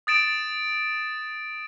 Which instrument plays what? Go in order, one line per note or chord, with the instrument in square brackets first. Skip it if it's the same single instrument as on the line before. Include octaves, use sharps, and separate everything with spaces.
[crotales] D#6 A6 D7 E7